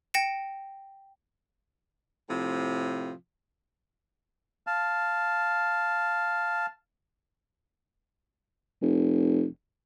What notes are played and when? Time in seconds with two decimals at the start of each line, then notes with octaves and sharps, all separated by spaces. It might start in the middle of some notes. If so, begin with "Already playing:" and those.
0.14 G5 A#6 C#7 E7
2.29 A2 C3 F3
4.67 F5 A5
8.82 F1